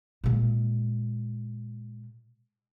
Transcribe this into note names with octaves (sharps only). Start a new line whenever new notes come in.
A#2 G#3